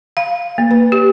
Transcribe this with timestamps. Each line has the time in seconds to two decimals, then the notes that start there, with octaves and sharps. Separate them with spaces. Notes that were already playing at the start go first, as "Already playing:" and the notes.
0.17 F5
0.58 A#3
0.71 B4
0.92 G4